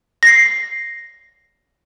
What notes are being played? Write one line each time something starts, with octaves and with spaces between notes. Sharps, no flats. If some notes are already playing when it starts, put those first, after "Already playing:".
A#6 C7